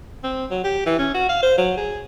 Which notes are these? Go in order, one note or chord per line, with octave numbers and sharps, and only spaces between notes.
C4
F#3
G4
E3
C#4
F#4
F5
C5
F#3
G#4